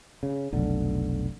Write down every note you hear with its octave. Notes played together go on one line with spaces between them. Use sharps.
C#3
F1 B1 D3